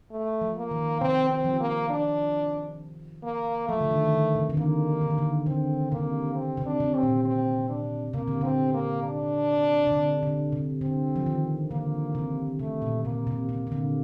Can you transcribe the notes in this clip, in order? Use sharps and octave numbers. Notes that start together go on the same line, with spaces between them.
A3
F3
A#3
D#3
C3 C4
C4
F3
A#3
D4
A#3
F3 A3
D3
D#3
D#3
D3
C3
D3
D#3 A#3
D3
D#3
D3
D3 C4
C3 A#3
C4
C3
D4
C3
C4
A#2
C4
D4
C3 A#3
D3
C3 C4
A#3
D4
C3
D3
D3
C3
D3 C4
F3
D#3
D3 A#3
C3
C3 A3
A#2
C3 A#3
C3
C3
C3
D3